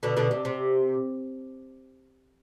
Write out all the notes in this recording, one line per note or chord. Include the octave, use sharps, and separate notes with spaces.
B2 D3
B2 D3
C3
C3